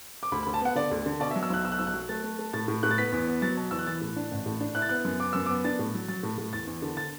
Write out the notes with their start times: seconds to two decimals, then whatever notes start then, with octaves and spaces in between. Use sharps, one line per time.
0.23 D6
0.32 D2 B5
0.43 B5
0.46 D2
0.54 A5
0.61 B3 F#5
0.75 D3 D5
0.91 D2
1.06 D3
1.20 B2 D5
1.31 E5
1.36 F#3
1.43 E6
1.50 B1 F#6
1.64 B2 E6
1.72 F#6
1.79 B1 E6
1.87 F#6
1.94 F#3
2.09 A3 A6
2.24 A3
2.39 A3
2.53 A2 A6
2.68 A2
2.83 A2 F#6
2.91 A6
2.98 B3 B6
3.12 E2
3.27 B3
3.42 F#3 A6
3.57 B2
3.71 E2 E6
3.79 F#6
3.87 E3 A6
4.01 A2
4.16 D4
4.31 A1
4.46 A2
4.61 D4
4.75 E4 F#6
4.82 A6
4.89 B3 F#6
5.05 F#2
5.20 B3 D6
5.33 F#2 E6
5.46 D6
5.49 B3
5.65 D4 A6
5.79 A2
5.94 F#3
6.08 F#3 A6
6.23 A2
6.38 A2
6.53 E2 A6
6.67 E2
6.82 D3
6.97 A6